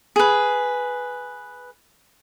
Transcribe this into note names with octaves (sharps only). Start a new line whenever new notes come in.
G#4 B4